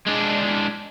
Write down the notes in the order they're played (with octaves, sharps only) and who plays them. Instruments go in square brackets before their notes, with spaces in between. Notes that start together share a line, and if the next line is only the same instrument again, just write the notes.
[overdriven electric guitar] G#3 D4